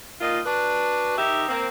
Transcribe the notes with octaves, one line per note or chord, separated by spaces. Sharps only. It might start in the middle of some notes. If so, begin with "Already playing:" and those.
A#2 D#3 F4 D#5
D4 F#4 B4 D5
D#3 D#4 G4 E5
A#3 C4